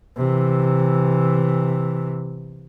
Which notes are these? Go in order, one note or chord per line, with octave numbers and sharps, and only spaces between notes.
C3 E3